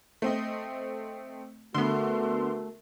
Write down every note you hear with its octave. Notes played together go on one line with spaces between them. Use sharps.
A3 C4 D#5
D3 A3 B3 F#4 A#4 C6